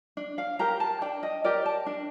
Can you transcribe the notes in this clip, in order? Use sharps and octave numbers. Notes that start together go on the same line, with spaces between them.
D4
F5
G4 A#4 A#5
A5
D4 G5
D#5
G4 A#4 D5
A5
D4